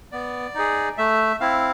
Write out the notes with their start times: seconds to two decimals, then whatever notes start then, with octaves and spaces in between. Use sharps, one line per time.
0.12 B3 D5
0.55 D#4 G#4
0.98 A3 E5
1.40 C4 E4 F5